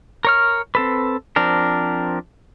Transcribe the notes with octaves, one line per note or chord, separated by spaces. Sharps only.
A#4 C#5 F6
C4 A4 B4
F3 C4 D4 A#4